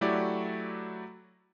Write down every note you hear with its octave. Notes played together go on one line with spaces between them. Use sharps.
F#3 A3 E4 F#4 G4 D5